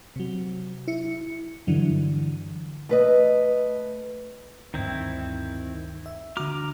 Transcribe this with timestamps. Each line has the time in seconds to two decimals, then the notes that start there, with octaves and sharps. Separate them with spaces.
0.16 C3 F#3
0.88 E4 C#7
1.67 G2 D3 E3 F#3
2.89 A3 B4 D#5
4.74 D2 G2 D#3 C4 E4
6.06 E5
6.37 D3 F#4 A#5 D6 F6